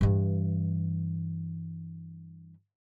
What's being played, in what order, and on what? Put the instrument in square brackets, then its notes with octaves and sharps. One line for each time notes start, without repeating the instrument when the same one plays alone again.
[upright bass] G2 E3